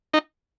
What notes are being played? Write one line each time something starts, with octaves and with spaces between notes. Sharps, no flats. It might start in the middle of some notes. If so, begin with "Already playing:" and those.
D#4